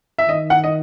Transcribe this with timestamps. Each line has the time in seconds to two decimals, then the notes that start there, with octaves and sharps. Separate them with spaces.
0.18 E5
0.28 D#3 D#5
0.50 F#5
0.64 D#5